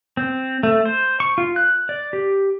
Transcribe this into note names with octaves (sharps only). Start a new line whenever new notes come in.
C4
A3
C5
C#6
F4
F#6
D5
G4